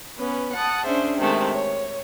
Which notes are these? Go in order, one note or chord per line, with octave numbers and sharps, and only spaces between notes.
B3 C#4 B4
F#5 A5 D#6
C#4 D4 G#4 C5 E5
C3 D#3 G#3 A3
C#5